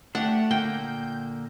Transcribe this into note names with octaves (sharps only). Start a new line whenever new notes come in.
A3 D4 G4 F#5
A#2 D3 A#3 G5 G6